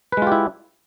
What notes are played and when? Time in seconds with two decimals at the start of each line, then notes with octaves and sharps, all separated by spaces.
0.12 B4
0.17 G#3
0.22 F4
0.27 G4
0.32 E4